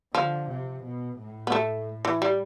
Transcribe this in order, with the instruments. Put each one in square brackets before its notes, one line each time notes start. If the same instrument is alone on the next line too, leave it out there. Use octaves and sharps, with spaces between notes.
[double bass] D3 [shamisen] F3
[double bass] C3
B2
A2
[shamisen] B3
A3
E3
G3